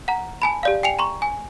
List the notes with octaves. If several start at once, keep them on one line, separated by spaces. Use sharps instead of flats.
F#5 A#5
G#5 A5 B5
G4 D5 F5
G5 G#5 C#7 F7
A#5 C6 C#6
G#5